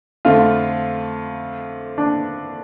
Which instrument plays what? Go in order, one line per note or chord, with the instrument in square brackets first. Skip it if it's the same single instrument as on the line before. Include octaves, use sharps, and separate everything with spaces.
[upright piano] F2 D3 A3 [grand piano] F4
[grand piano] D4